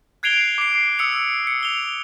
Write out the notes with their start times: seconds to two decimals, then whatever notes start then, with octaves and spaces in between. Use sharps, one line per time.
0.23 F#6 G#6 C7 D7 F7 G7
0.58 D6 C7
0.99 D#6 E6 C#7 F7
1.47 C#7
1.63 F7 G7